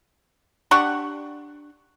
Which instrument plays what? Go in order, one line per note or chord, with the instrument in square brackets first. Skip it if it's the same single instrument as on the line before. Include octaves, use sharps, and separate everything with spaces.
[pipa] D4 G4 F#5 C#6